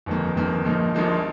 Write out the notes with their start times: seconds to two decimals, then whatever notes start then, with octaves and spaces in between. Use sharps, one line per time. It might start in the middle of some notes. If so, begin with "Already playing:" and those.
0.06 G1 F2 D#3 A#3
0.36 G1 F2 D#3 A#3
0.65 A#1 A#2 F3 A#3 D#4
0.95 A#1 A#2 F3 A#3 D#4